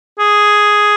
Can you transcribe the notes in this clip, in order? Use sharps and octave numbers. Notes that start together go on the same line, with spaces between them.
G#4